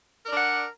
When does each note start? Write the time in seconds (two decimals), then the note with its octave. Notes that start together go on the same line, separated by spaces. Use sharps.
0.24 A#4
0.29 D5
0.33 D4
0.37 F#5